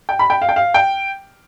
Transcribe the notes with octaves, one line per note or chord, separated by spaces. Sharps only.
G5
B5
G5
F5
G5
F5
G5